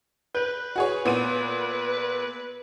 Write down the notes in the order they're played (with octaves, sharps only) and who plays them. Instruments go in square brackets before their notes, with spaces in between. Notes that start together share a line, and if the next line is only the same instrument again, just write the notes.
[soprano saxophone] B4 [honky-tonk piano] G6
[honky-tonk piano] F#4 G#4 C#5
A#2 B3 D#7